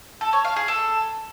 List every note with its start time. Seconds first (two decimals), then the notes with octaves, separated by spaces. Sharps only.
0.21 A4
0.33 C#5
0.45 F5
0.56 G#4
0.68 A4